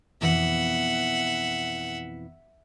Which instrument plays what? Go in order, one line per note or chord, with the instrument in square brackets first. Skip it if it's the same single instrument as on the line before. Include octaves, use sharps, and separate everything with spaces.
[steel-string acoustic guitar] F2 B2 E3 [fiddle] E5 F#5